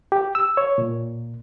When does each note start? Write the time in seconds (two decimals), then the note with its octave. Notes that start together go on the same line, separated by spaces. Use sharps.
0.12 G4
0.35 E6
0.57 C#5
0.78 A#2